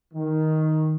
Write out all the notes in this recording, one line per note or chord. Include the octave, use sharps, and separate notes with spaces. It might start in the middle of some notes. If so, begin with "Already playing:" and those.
D#3